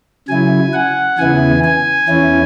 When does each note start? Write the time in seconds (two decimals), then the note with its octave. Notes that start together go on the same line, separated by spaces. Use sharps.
0.28 C#3 F#3 E4 G#5
0.73 F#5
1.18 E2 C#3 E3 B3 E4 G#5
1.64 G#5
2.09 E2 E3 C#4 E4